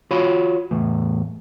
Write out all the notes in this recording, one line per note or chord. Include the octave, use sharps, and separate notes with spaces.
F4 F#4 C#5 B5
E2 A2